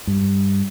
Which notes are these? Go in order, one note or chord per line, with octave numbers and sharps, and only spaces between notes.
G2